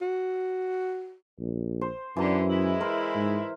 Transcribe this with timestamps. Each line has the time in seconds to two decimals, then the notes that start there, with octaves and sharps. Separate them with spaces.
0.01 F#4
1.39 A#1
1.81 C5
2.17 F#2 D3 E3 A#5
2.50 G#3 E4
2.80 A#4 C5
3.15 G#2